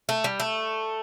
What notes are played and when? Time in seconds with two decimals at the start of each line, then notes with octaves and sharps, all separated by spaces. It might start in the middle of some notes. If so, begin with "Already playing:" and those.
0.09 A3
0.24 G3
0.40 A3